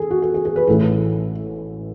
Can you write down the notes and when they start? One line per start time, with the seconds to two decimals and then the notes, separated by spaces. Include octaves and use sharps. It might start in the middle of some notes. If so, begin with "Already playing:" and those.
Already playing: G#4 A4
0.11 F#4
0.22 G#4
0.34 G#4
0.45 G#4
0.56 B4
0.67 A1 A2 E3 A3 A4